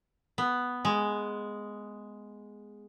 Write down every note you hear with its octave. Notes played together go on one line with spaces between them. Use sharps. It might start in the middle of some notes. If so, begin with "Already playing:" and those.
B3
G#3